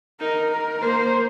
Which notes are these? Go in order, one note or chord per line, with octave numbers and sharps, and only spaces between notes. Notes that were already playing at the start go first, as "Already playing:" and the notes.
D#4 A#4
A#4
A#3 C5